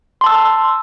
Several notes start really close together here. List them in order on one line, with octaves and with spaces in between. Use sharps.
C6 A5 E6